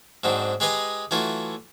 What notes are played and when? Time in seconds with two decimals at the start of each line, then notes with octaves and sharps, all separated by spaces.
0.24 G#2 F#3 C4 D4
0.60 G#3 G4 G#4 B4 D#5 G#5
1.11 E3 F#3 A3 E4 F4